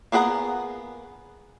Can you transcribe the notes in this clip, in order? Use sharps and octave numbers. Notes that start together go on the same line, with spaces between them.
A#3 B3 G#4 F#5 A#5